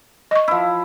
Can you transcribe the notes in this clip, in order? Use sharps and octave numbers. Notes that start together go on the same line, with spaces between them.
D#5 C#6
F3 E4